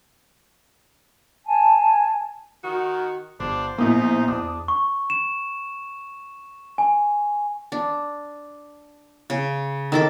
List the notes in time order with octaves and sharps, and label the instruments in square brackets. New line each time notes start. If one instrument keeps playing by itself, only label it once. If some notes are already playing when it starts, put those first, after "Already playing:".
[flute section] G#5 A5
[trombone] D#3 [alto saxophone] F#4
[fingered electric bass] G1 [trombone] D4 [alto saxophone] C5
[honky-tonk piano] A#1 E4 D#6 [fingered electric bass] A#3 B3 [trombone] D#4
[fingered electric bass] E2 [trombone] D4 [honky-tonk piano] D#6
[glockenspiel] C#6
E7
G#5
[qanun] D4
C#3
D#3 A4 D6